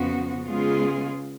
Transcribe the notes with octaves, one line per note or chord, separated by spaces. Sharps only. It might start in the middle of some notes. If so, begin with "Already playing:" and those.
Already playing: F2 C#3 F3 B3 F#4
C#3 G#3 B3 F4 G#4